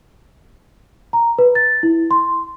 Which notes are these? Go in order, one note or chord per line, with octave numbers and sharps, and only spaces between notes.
A#5
B4
A6
E4
C6